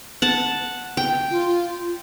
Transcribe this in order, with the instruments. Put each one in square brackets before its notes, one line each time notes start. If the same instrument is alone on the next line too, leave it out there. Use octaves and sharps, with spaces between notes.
[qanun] F#5 A5
G5
[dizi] F4